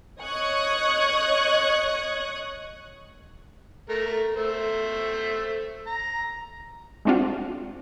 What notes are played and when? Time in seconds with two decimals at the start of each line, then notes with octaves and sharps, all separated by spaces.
0.21 C#5 D#5 C#6 D#6 F#6 G#6
3.89 A3 A#4
4.36 A3 C5 E5
5.87 A#5
7.05 G#3 A3 C4 D4 F4 F#4